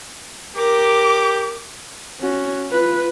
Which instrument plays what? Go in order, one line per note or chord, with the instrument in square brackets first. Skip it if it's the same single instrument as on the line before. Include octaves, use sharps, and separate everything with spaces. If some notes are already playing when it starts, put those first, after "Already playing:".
[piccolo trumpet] G4 [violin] A#4 [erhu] D6
[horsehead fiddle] C#4 F#4
F4 B4